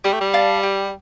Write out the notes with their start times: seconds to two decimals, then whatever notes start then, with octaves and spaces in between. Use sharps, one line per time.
0.04 G3 G4
0.13 A3
0.21 G3
0.34 D5 F5 A5
0.63 G4